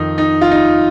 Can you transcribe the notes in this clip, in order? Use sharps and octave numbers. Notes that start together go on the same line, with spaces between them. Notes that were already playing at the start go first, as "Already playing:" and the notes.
Already playing: F2 D#3 D#4
D#4
F4
D#4